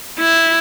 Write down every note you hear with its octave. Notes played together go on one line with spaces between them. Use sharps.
E4